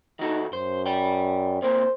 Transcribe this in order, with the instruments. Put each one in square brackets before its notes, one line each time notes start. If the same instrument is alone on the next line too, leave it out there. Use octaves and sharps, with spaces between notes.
[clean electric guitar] D#3 F#4 A4 [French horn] D#4
[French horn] F#2 [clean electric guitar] C5
[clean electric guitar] D5 G5
[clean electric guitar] C3 A#3 A#4 [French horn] C5